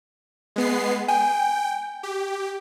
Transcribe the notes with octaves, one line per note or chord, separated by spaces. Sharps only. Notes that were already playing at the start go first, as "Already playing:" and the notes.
G#3 B3 C7
G5 G#5
G4